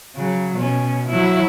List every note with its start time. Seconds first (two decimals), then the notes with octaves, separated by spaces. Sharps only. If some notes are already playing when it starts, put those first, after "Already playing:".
0.16 C#3 F#3
0.56 B2 C#4
1.08 F#3 E4